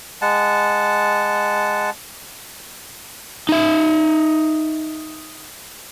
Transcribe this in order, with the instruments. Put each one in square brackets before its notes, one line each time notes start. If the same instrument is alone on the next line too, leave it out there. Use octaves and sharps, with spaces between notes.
[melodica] G#3 F#5 A5
[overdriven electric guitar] D#4 E5